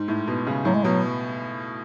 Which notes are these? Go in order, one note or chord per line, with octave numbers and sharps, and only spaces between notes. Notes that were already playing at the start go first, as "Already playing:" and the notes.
Already playing: G#2
A2
B2
C#3
A2 F#3
G#3
B2 F#3